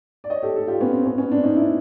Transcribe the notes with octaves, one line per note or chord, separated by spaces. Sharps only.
D5
C#5 D#5
G4 A4
G4 A4
F4 G4
B3 C#4
C4
B3 C#4
B3 C#4
C4 D4
C#4 D#4
D4 E4